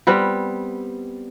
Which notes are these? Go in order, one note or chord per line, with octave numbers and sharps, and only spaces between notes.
G3 B3 C4